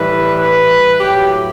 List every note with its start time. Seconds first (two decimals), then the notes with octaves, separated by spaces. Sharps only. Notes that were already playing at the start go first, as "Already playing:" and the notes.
Already playing: A2 E3 G3 B4
0.37 B4
0.99 A2 F#3 G4